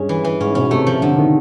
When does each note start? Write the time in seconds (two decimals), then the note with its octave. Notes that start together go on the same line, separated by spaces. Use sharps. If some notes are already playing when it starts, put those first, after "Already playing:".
Already playing: G2 G#3 C#4
0.09 E3
0.24 E3
0.40 G#2 C#4
0.55 B2 C#4
0.71 C3 A3
0.87 F3
1.02 D3 F3
1.18 D#3